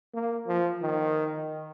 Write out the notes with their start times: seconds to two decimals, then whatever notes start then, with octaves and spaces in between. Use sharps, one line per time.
0.14 A#3
0.47 F3
0.82 D#3